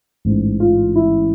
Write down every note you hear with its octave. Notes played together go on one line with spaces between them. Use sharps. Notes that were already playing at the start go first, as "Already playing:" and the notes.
A1 G#2 E3
F4
E4